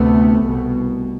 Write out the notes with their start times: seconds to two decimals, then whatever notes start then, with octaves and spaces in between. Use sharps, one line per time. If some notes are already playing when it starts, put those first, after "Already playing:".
Already playing: D2 C3 A3 B3
0.43 C2 B2